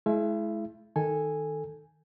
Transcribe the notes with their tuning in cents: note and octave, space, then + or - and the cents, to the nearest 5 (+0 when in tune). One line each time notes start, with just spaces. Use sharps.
G#3 +40 E4 +0 E5 +40
D#3 +0 A4 +0 G#5 -5